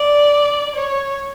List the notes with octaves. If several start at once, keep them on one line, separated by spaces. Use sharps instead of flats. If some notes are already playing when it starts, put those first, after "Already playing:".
Already playing: D5
C#5